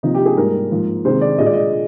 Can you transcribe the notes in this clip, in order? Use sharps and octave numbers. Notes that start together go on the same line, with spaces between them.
C3 F3 A#3 D#4
G4
G#4
G#2 G3 A#3 A#4
G#2 F3 A#3
C3 D#3 G#3 C5
D5
A#2 G#3 D#5
D5
D#5